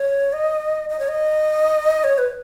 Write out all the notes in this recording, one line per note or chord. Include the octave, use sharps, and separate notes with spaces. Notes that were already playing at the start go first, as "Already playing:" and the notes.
Already playing: C#5
D#5
D#5
C#5
D#5
C#5
B4